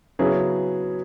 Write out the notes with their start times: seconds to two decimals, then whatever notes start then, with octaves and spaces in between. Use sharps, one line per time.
0.19 C#3 F#3 B3 E4 G#4